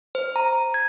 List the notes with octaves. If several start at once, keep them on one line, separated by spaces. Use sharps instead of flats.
C5
A#5
G#6